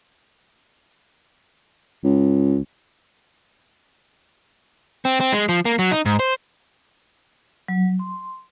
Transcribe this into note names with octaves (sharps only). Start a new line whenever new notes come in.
C#2
C4
C4
G#3
F3
A#3
F#3
D#4
G#2
C5
F#3
C6